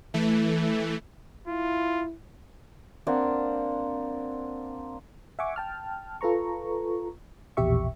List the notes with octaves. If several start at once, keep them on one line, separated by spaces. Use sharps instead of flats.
E3 A3
E4 F4
A#3 C4 D4 F#5
E5 F#5 G#5 C#6 D6
G5 A5 F6
F4 A4 B4 A#5 C#6
A#1 E2 B2 G4 E5 C#6